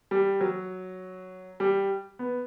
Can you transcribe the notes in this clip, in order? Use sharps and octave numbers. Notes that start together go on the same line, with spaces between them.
G3
F#3
G3
B3